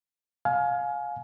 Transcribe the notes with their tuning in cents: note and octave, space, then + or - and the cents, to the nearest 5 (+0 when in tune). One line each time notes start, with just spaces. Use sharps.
F5 +20 G#5 +25